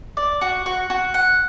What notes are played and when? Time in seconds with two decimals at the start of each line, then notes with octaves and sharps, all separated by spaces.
0.17 D5
0.41 F#4
0.66 F#4
0.90 F#4
1.14 F#5